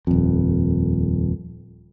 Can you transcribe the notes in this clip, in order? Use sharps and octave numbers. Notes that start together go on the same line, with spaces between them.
D#1 F2